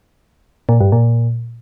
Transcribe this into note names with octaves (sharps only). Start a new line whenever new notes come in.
A#2
G2
A#2